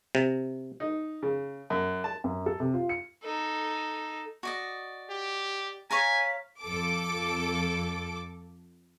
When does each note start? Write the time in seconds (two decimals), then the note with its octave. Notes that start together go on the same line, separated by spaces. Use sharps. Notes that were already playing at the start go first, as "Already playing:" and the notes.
0.15 C3
0.80 D#4
1.23 C#3
1.70 F#2
2.04 A5
2.24 F#2
2.46 A4
2.60 C3
2.74 F4
2.89 C#7
3.23 D#4 A4
4.43 F#4 D5 D#5
5.10 G4
5.91 C#5 F5 G#5 A#5 B6
6.62 F2 A4 D6